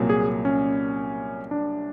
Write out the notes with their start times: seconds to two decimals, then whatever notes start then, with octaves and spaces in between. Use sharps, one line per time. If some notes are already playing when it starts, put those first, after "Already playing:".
Already playing: C2 A#2 F#3 A#3
0.09 G#4
0.45 C#4
1.51 D4